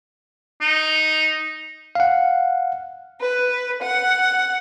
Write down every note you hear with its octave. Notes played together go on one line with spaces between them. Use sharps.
D#4
F5 F#5
B4
F#5